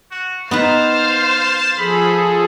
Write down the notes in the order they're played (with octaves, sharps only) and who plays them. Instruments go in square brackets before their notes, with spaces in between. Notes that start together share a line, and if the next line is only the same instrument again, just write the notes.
[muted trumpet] F#4
[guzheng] B3 D#4 B4 [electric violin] C5 F5 [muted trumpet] A5
[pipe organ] F3 G#4 A4 [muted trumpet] B5